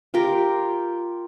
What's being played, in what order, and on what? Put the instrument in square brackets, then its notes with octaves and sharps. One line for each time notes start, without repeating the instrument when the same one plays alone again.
[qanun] F4 G4 A#4